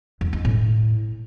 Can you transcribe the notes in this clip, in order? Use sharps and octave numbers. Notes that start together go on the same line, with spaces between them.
E2
G#3
A2